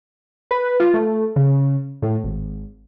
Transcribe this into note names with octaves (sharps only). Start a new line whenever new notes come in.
B4
F4
A3
C#3
A2
G#1